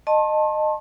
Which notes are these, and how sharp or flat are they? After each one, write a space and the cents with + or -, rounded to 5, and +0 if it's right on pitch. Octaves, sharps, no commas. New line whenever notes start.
D#5 -20 A5 +0 C6 +40